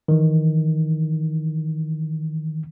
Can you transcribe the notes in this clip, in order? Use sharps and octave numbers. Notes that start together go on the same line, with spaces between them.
D#3 E3